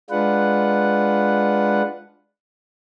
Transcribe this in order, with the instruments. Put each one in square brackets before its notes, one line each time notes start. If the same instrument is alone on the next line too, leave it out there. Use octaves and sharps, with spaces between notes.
[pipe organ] G#3 D4 F4 B4 F#5